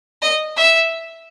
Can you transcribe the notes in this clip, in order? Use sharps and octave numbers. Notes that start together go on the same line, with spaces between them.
D#5
E5